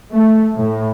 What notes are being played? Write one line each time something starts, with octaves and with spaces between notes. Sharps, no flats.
A3
A2